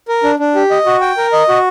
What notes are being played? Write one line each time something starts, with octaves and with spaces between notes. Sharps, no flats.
A#4
D4
D4
G4
D#5
F#4
G5
A#4
D#5
F#4